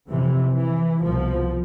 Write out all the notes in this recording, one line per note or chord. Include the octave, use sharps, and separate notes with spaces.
F2 C3 E3
E3
C2 B2 F3